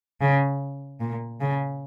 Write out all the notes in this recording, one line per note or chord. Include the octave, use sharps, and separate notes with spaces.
C#3
A#2
C#3